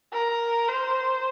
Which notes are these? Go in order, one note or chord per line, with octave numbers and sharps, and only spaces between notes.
A#4
C5